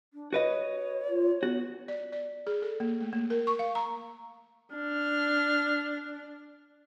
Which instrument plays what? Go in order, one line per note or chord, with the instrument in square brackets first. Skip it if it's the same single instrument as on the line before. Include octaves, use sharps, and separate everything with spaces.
[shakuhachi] D4
[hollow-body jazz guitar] F#4 B4 D#5 [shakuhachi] C#5
[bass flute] F4
[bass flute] B3 [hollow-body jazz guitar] F#4
[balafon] D5
D5
G#4
A4
A#3
A3
A#3
A#4
C#6
F5
A#5
[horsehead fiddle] D4 [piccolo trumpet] F6